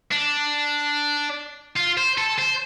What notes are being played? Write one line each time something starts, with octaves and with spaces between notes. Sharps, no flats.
D4
F4
C5
A4
C5